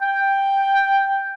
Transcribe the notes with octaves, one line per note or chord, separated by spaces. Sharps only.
G5